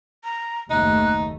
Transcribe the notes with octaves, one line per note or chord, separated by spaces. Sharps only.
A#5
F#1 D#2 A3 D#4 F#6